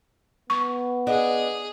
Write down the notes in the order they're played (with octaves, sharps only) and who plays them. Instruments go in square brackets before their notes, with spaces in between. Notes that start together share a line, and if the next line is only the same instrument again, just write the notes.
[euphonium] B3 [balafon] C#6
[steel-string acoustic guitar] D4 D#5 F#5 [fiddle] G#4